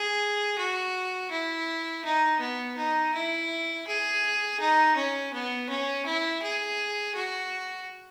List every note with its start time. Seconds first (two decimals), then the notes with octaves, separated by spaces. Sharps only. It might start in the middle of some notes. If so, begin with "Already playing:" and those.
Already playing: G#4
0.58 F#4
1.31 E4
2.05 D#4
2.40 B3
2.77 D#4
3.14 E4
3.87 G#4
4.60 D#4
4.96 C#4
5.33 B3
5.69 C#4
6.06 E4
6.42 G#4
7.15 F#4